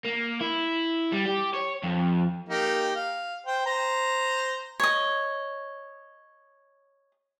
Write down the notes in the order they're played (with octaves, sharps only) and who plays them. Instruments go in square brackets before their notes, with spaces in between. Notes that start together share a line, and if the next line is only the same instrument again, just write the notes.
[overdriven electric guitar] A#3
E4
G3
G4
C#5
F2
[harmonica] A#3 D#4 G4
F5
C5 G5
C5 A#5
[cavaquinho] C#5 D#5